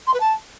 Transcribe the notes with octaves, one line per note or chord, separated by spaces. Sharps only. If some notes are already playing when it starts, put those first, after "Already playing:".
C6
B4
A5